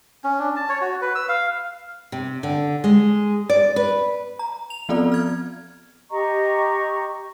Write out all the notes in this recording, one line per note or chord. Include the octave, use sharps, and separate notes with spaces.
C#4
D4
A5
C#5
F#4
B4
E6
F5
C3
D3
G#3
D5
B4
A#5
F7
F3 B3 C4 F4 A4 D5
F6 G#6
G4 D#5 A#5 C#6